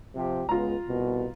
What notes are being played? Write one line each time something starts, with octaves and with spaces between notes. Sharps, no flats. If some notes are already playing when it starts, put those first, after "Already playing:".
C3 F3 G4
C#2 G#3 B3 F4 A#5
C2 B2